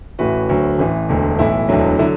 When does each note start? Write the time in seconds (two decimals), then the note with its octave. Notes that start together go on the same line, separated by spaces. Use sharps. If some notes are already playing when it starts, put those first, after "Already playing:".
0.19 A1 A2 E3 F#4 B4
0.49 D2 D3 F#3
0.78 A1 A2 E3
1.09 E1 D2 D3
1.38 B1 A2 E3 E4
1.69 E1 D2 D3 F#3
1.99 D3 F#3 E4